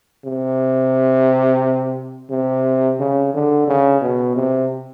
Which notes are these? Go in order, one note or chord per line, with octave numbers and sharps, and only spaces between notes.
C3
C3
C#3
D3
C#3
B2
C3